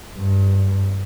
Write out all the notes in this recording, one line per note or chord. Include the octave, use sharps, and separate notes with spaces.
G2